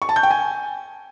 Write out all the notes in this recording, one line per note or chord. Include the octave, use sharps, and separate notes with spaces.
C#6
A5
G6
G5
G#5